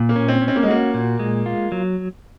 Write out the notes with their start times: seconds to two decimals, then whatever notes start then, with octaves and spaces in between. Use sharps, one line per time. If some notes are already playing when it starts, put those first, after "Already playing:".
Already playing: A#2
0.09 A#3
0.16 C#4
0.28 C4
0.41 C#4
0.48 C4
0.56 A#3
0.63 G#3
0.68 A#3 F#4
0.94 A#2
1.19 G#3
1.46 F4
1.72 F#3